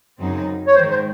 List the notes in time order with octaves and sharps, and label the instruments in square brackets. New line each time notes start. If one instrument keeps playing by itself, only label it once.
[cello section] F#2 C#3 F#3 C4 D#4
[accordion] C#5
[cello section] G#2 D#3 G#3 [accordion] C5
[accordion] C5